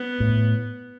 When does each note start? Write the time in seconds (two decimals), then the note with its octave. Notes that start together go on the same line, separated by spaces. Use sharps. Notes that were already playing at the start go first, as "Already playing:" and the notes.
Already playing: B3
0.20 A2